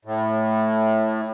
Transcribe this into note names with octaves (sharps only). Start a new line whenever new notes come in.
A2